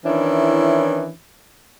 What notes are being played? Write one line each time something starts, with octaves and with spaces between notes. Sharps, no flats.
D#3 E3 C#4 D4 E4